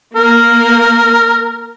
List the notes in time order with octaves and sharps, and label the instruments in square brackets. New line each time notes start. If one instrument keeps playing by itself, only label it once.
[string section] A#3 [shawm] A#4